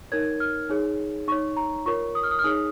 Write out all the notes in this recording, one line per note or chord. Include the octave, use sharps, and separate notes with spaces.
D#4 A#4 C#5 G#6
F6
D#4 G#4 C#5
D#4 C#5 C#6
A#5
F4 A#4 C#5 C#6
D#6
F6
D#6
F6
D#4 G#4 C#5 D#6